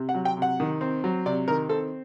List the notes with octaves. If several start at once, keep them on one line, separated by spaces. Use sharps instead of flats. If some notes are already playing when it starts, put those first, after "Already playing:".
Already playing: C3
F#5
F#3
G5
C3 F#5
D#3
C4
F#3
C3 D5
D#3 A#4
C4 A4